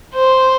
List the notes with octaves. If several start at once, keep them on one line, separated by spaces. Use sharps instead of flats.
C5